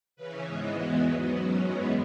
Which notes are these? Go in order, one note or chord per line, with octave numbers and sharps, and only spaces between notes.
C#3 E3 C#4 B4
G#2 E3 G#3 B3 G#4
E2 E3 G#3 B3 F#4
G#2 F#3 B3
G#2 F#3 C#4 F#4
F#2 E3 G#3 B3 G#4